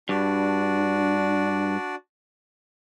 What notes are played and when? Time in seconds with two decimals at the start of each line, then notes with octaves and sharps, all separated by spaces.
0.09 G2 D4 F#4 D5